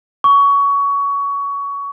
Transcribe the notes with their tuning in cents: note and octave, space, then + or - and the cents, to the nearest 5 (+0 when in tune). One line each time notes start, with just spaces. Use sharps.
C#6 +20